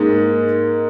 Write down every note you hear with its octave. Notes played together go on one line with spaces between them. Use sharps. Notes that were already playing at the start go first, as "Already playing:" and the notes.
Already playing: G#2 G#3 A#3 D#4 A#4 D#5